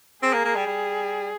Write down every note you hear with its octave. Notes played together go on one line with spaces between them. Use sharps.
C4 G#4
A#3
A#3
G3
G3